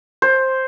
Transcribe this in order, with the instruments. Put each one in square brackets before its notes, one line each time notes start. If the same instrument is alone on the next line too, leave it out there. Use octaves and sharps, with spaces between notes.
[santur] C5